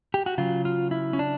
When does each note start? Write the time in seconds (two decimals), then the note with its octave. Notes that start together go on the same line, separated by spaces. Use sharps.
0.14 G4
0.26 F#4
0.38 C#3 F#3 F4
0.65 F4
0.91 E4
1.13 C#4
1.19 D4